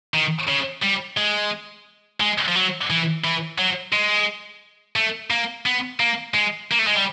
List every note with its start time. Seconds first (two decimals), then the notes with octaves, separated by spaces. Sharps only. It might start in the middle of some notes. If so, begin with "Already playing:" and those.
0.14 D#3
0.49 C#3
0.83 G3
1.17 G#3
2.20 G#3
2.48 F3
2.56 F#3
2.90 E3
3.24 E3
3.59 F#3
3.93 G#3
4.96 A3
5.31 A#3
5.66 B3
6.00 A#3
6.35 G#3
6.72 A#3
6.79 A3
6.87 G#3
6.95 G3